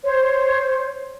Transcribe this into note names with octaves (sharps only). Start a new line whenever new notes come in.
C5 C#5